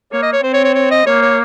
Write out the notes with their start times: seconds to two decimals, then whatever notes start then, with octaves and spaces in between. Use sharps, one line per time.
0.12 A#3 C#5
0.22 D#5
0.33 C#5
0.43 C4 C5
0.54 C#5
0.64 C#5
0.75 C#5
0.91 D#5
1.06 A#3 C#5
1.22 C#5